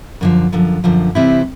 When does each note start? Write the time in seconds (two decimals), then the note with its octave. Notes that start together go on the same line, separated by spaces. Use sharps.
0.21 F#2 D3 F3
0.52 F#2 D3 F3
0.84 F#2 D3 F3
1.15 C3 E3 G3 C4 E4